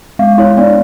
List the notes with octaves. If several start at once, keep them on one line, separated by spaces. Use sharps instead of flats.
G#3 F5
E4 C#5
B3 D5